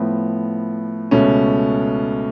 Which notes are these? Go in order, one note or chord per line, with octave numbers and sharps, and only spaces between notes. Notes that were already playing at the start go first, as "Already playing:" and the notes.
Already playing: A2 F3 B3
C#2 B2 A3 C#4